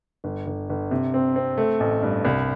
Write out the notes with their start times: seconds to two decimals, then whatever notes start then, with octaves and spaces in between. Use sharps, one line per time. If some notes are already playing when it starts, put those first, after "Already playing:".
0.24 G1
0.47 G1
0.69 G1
0.91 C3
1.14 C4
1.36 C4
1.58 A3
1.80 A1
2.03 G2
2.25 C2